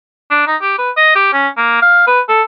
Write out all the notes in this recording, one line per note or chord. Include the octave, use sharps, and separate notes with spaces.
D4
D#4
G4
B4
D#5
G4
C#4
A#3
F5
B4
A4